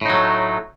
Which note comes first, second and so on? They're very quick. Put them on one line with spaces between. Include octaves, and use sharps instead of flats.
A2 D#4 F#3 A3